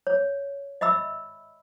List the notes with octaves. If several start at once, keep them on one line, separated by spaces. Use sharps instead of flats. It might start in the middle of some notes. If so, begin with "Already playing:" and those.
C#5
D#5 E5 B5 E6